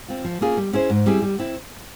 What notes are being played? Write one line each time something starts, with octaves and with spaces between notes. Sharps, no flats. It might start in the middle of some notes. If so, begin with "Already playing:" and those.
C4 F4
F3
A#3 C#4 F4 G#4
G3
C#4 E4 G#4 C5
G#2
G3 C4 E4 G#4
G3
C4 E4